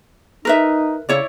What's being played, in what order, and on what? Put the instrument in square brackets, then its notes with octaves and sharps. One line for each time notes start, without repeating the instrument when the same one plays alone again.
[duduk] D#4 [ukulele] A#4 B4 E5
[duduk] C#3 [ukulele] E4 C#5 D5